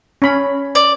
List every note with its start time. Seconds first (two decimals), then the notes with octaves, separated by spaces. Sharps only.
0.22 C#4 B5
0.75 D5